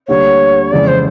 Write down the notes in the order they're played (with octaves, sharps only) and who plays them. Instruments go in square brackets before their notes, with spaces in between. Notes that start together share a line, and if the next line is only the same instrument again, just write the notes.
[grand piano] D2 D3 G3 A#3 [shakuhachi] C#5
[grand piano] F2 C#3 E3 G#3 [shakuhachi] D5
[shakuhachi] C5